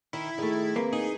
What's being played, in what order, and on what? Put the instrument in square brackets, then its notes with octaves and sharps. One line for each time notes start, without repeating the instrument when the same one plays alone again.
[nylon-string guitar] D#3 [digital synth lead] E4
[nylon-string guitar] D#3 A3 [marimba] G#4
[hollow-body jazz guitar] A#3 [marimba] C4 B4
[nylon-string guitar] D#4 [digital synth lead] G#4